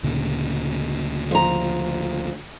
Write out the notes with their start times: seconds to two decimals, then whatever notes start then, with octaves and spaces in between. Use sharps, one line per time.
0.03 D2 A#2 C#3
1.31 F3 A#5